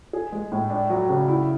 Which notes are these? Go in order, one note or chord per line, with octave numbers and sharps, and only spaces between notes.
G#4
G#3
A2
D4
F#3
C#3
E4